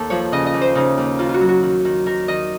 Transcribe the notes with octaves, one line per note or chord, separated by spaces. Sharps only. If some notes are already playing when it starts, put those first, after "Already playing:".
Already playing: D#2 A4
F3 C#5
C#3 D#5
D#5
D#2
C5
C#3 D#4
D#2
D#3 F4
F4 F#4
F#3
F#4
D#3
D#3
D#3 A#4
D#3 D#5